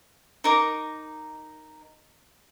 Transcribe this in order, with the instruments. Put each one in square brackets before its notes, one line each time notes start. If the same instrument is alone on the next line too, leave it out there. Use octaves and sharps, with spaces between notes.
[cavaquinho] D#4 A#4 D6